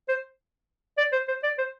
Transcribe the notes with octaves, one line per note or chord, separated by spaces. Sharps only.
C5
D5
C5
C5
D5
C5